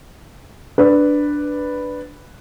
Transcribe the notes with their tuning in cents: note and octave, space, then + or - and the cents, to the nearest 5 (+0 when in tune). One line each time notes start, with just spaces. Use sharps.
D4 +0 B4 +0